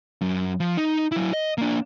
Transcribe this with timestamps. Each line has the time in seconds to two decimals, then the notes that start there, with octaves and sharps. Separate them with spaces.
0.21 F#2
0.60 F3
0.77 D#4
1.12 F#3 E4
1.33 D#5
1.58 A#3 D4